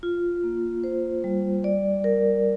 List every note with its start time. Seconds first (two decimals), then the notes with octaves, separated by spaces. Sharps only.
0.03 F4
0.44 A#3
0.84 C5
1.24 G3
1.64 D5
2.04 A#4